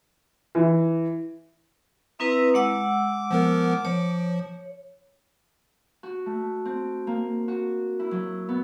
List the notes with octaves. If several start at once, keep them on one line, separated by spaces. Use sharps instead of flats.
E3
C4 E4 B4 E5 A#5 D#6
G#3 F#5 D6 E6
F3 B3 A#4
F3 C#5
F#4
A3
C4
A#3
F#4
E4
F#3
B3